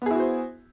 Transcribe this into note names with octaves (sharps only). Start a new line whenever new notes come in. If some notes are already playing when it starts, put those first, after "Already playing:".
B3 E4 F#4 G#4 C5